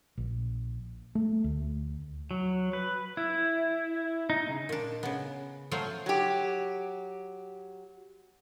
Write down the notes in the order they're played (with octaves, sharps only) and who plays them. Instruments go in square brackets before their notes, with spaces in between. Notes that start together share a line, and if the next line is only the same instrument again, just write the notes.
[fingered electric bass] A#1
A3
D2
[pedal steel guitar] F#3
B4
E4
D#4
C#3
[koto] A#2 D4
C#3 B3
F3 F#3 A3 C5
[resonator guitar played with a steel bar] F#3 G4